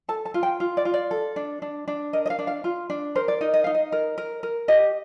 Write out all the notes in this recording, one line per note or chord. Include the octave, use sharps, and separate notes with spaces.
A4 A5
A5
F4
G5
F4
D5
F4
D5
A4
D4
D4
D4
A#4 D#5
D#5
F5
D4
F5
F4
D4
A#4 C5
D5
D#4 D#5
D#5
D#4 F5
D#5
A#4
A#4
A#4
G4 D#5